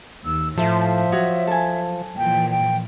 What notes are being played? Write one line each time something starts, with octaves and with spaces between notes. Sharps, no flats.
D#2 E6
A2 F3 A4 E5
F#3 F#4 C#5 D#6
A4 G#5
A#2 E3 F3 G5
G5